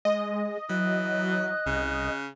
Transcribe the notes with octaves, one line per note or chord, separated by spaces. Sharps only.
G#3 D#5
E3 F#3 F#6
C2 C#3